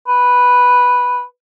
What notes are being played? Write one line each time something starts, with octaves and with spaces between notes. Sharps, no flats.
B4